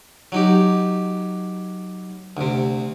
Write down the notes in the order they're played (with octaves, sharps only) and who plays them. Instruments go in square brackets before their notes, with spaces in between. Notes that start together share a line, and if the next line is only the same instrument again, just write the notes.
[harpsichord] F#3 D#4 G4
D2 C3